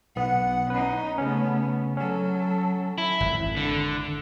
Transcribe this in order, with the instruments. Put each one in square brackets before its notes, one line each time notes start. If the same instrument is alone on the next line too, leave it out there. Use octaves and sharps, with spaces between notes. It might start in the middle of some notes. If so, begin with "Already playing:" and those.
[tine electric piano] B1 B3 [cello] F#5
[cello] C#4 D#4 [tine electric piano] B4
[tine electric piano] C#3 C#4 [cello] A3 B3
[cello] F#3 A4 [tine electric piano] C#4
[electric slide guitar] E4
[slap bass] G#1 F2
[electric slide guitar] D3